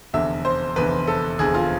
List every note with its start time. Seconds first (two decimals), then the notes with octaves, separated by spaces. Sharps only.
0.13 F1 E2 D3 E5
0.45 C5
0.76 F1 E2 D3 B4
1.07 A4
1.39 F1 E2 D3 G#4
1.54 F4